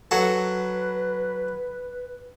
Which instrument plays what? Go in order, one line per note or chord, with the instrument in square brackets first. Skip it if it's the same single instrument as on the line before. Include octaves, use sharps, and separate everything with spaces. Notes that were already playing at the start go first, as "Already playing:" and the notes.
[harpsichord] F#3 F#4 A4 [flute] B4